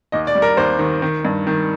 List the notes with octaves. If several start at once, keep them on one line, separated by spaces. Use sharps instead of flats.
D#2 D#5
D5
G3
A#4
D#2 C5
D#3
D#3
G2
D#3